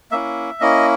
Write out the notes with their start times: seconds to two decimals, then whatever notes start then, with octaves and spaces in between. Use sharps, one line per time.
0.11 A#3 C#4 E4 E5
0.60 A#3 C#4 E4 D#5